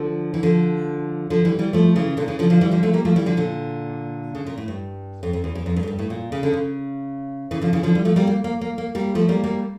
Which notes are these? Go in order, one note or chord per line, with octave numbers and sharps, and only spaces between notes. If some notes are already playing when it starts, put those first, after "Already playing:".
Already playing: D3 F3
E3
D3 F3
D3 F3
E3 G3
E3 G3
F3 A3
C#3 E3
A#2 D3
C#3 E3
D3 F3
D3 F3
E3 G3
D3 F3
F3 A3
G3 A#3
F3 A3
E3 G3
D3 F3
A#2 D3
C#3
A#2
A2
G2
F2
F2
E2
E2
F2
G2
F2
G2
A2
A#2
C#3
D3
C#3
C#3 E3
D3 F3
C#3 E3
D3 F3
E3 G3
F3 A3
G3 A#3
A#3
A#3
A#3
A#3
G3 A#3
F3 A3
G3 A#3
G3 A#3